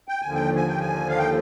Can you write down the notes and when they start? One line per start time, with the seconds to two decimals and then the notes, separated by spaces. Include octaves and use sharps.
0.08 G5
0.22 D#2 D3 F3 G#5
0.34 G5
0.56 G#5
0.68 G5
0.80 G#5
1.09 F5
1.18 G5